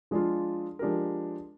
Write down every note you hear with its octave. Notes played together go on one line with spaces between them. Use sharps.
F3 G#3 D4 F4
F3 G#3 D4 G4 A#4